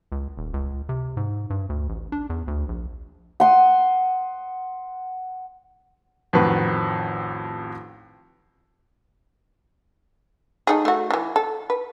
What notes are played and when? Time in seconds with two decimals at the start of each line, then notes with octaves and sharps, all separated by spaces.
0.12 C#2
0.37 D#1
0.54 C#2
0.89 C3
1.17 G#2
1.50 G2
1.69 D2
1.89 A1
2.12 D4
2.30 E2
2.47 D2
2.68 A#1
3.40 F#5 C6 D#6
6.33 A1 F2 D#3 F3 F#4 B4
10.67 A3 D#4 G#4
10.85 A3 F#4
11.11 C#3 E3
11.36 A4
11.70 B4